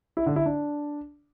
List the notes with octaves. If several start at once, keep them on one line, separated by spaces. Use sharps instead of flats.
E4
D3
E4
D4